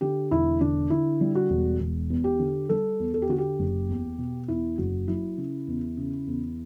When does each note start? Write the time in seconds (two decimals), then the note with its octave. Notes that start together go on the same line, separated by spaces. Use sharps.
0.01 D3 G4
0.31 E1 E4
0.61 D3 D4
0.90 D3 E4
1.21 G3
1.35 F#4
1.50 E1
1.80 E1
2.10 E2
2.24 G4
2.39 D3
2.69 G3 A4
2.99 E2
3.14 A4
3.22 G4
3.29 D3 F#4
3.38 G4
3.59 F#1
3.89 E2
4.18 B2
4.48 E2 E4
4.78 F#1 F#4
5.08 F#3 E4
5.37 C#3
5.67 E2
5.97 C#3
6.27 E2